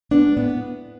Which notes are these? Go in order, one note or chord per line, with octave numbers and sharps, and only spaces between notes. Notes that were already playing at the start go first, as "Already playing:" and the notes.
G#3 B3 D4
A2 B3